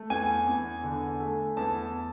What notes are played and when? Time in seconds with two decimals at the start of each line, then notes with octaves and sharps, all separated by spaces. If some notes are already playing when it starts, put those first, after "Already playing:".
Already playing: A3
0.10 E2 G#5
0.47 E2
0.83 D3
1.20 A3
1.57 E2 A5